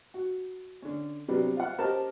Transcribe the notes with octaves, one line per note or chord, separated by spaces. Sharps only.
F#4
D3 C#4
C3 F#3 G3 B3 D4
F4 F#5
C#4 G4 A#4 C5 D#5 A5